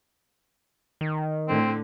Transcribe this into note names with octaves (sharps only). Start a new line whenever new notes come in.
D#3
A2 D3 C4